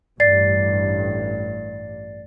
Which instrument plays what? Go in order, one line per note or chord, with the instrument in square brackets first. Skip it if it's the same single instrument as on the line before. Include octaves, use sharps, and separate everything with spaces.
[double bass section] A1 G2 [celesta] D5 A6 C7